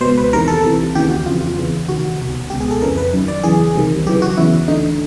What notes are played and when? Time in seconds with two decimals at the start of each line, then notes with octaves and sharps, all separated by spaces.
0.01 B2 C5
0.05 C#2
0.18 B4
0.33 E2 C3 D#3 A#4
0.48 A4
0.64 C2 C3 E3
0.95 D#2 C#3 E3 G4
1.10 F#4
1.26 F2 C#3 E3 F4
1.41 F4
1.57 E2 C#3 E3
1.88 D2 C3 D#3 F#4
2.19 C2 B2
2.50 C#2 B2 G4
2.60 G#4
2.71 A4
2.82 F2 C#3 E3 A#4
2.97 B4
3.13 F#2 D#3
3.28 D5
3.43 E2 C#3 E3 G#4
3.76 C2 C3 D#3
4.06 F#2 C#3 E3 G4
4.22 F#4
4.37 E2 C#3 E3 E4
4.68 D2 D3 D#4